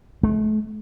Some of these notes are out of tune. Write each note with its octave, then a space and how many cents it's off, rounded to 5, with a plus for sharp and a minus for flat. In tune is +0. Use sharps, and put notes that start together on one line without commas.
A3 -40